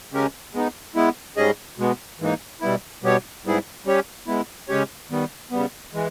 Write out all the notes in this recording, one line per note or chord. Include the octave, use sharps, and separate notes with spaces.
C#3 G#3 C#4 G4 A#4
G#3 B3 D#4
G#3 B3 E4
G#2 G3 C#4 G#4 D#5
B2 G#3 B3
G#2 E3 A#3 D#4
B2 G3 B3 E4
B2 G3 B3 G4 C#5
G#2 G3 B3 E4 G#4
G3 C#4 G4 C#5
G#3 B3 E4
C#3 G#3 C#4 G4 C#5
D#3 G3 B3
C#3 G3 B3
E3 G#3